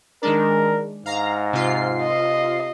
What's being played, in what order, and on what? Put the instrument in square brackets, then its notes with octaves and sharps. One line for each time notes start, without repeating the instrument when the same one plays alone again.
[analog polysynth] D#3 G#3 D4 [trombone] A#4
[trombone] G#2 [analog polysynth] F5 A#5
[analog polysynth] C3 F4 C7
[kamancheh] D#5